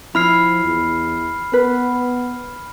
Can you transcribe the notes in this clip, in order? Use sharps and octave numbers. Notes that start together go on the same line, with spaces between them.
F3 E4 B5 F6 C7
E2
B3 B4